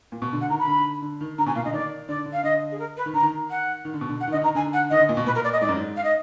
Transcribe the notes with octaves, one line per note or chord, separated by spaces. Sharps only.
A#2
B2
D3
F#5
D#3 A#5
B5
D3
D3
D#3
D3 A#5
B2 G#5
A#2 F5
D3 D#5
D#3 D5
D3 D5
D3
F5
D3 D#5
G#4
A#4
B4
D#3
D3 A#5
D#3
F#5
D#3
D3
B2
D3
F#5
D#3
D3 D#5
D#3 A#5
D3 G#5
F#5
D#3 D#5
D3
A#2
B2
A#2 B4
A#4
D5
D#5
G#2 D5
F#2
G#2
F5
D#5